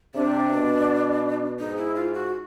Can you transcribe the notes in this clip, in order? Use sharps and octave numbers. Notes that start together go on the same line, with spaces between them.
C3 D4
B2
G#2 D#4
E4
F4
F#4